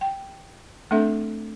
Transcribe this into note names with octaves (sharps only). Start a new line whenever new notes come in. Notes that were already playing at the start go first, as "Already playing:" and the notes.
G5
A3 C4 D4 A4 E5